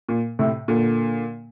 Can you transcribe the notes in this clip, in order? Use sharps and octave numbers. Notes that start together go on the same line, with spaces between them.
A#2
A2 C3
A#2 D3